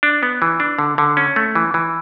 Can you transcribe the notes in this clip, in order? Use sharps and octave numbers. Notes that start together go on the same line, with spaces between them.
D4
B3
E3
D4
D3
D3
C#4
A3
E3
E3